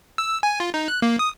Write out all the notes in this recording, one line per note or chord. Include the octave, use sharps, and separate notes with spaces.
E6
G#5
F4
D#4
F#6
A#3
D#6